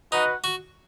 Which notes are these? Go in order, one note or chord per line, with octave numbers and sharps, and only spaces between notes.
D#4 F#4 B4 D#5 F#5
F#4